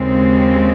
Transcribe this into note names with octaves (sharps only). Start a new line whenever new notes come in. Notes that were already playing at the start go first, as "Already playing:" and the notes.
Already playing: D#2 C#3 G#3 C4